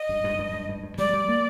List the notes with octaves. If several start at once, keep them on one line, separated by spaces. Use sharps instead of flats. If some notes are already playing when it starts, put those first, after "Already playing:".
Already playing: D#5
G2
G2
G2
G2
G2
G2
G3 D5
G3
A#3